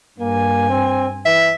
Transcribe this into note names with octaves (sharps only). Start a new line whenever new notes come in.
G2 A#3 G#5
C4
E3 E5